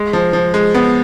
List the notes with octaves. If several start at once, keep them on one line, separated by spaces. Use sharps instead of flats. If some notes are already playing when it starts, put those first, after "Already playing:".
Already playing: G#3
F3
F3
G#3
B3